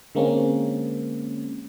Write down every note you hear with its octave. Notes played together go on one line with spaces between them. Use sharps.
D3 G#3 A#3 C4 C#4